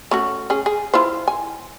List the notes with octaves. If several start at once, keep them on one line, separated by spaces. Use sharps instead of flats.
A3 C#4 F#4
C#4 G#4
G#4
E4 F4 C5
G#5